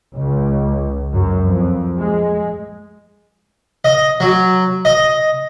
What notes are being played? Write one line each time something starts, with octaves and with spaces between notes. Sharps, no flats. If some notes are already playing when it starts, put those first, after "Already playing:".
C#2
F#2
F2
G#3
D#5
F#3
D#5